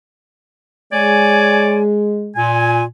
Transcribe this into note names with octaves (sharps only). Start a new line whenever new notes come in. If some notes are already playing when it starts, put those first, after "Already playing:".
G#3 C#5 D5 G#5
A#2 G#5